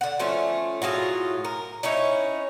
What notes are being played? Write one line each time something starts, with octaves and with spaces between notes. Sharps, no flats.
D3 F#5
F3 A3 C#4
A2 F#3 F4 G#4
A#4
C#4 D#4 E4 C#5